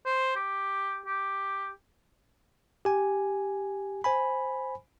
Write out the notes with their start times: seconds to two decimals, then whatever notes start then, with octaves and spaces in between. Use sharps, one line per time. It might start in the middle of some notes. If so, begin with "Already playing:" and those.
0.05 C5
0.36 G4
1.06 G4
2.85 G4 G#5
4.04 C5 G#5 B5